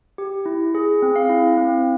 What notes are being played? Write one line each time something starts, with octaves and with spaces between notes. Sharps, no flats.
G4
E4
G#4
C4
F5
E4
C4